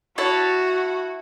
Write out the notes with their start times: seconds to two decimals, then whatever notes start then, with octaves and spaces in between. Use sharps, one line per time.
0.18 E4 F#4 C#5 A5